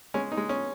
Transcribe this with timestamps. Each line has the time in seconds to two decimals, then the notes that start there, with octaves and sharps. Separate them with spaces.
0.14 G#3 C#4
0.32 D#4
0.37 G#3
0.49 C#4